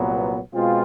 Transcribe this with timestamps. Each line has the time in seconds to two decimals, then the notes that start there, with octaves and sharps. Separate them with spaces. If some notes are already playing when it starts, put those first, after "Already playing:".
Already playing: C2 A#2 F#3 B3
0.53 B2 G#3 C4 F4